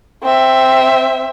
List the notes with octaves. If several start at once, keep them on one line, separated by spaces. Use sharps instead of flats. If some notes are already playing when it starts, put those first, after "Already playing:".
C4 E5